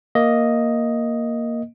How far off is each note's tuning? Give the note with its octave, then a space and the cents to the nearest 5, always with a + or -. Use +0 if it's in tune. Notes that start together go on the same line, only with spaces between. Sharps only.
A#3 +0 D#5 +5